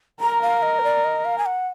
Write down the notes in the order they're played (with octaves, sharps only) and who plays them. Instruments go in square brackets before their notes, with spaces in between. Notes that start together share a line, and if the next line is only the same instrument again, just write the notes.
[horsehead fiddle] A#4 [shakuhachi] A#5
[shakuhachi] F5
D#5
B4
D5
D#5
F5
G#5
F#5